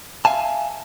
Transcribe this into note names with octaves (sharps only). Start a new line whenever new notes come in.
E5 F5 G#5 A5